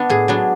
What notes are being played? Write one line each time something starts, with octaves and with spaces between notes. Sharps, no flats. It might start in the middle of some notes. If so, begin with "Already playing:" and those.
Already playing: B3 D4
A2 G#4
F#3 B3 D4